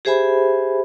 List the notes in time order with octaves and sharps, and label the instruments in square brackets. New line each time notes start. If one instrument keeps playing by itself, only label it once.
[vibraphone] G4 G#4 C5 E5 G#5 B5